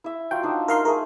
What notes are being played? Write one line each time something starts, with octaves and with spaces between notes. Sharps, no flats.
E4 E5
F#3 F4 G5
D4 D#4 C5
D#4 A#4 F5 C6
A3 G#4 A#4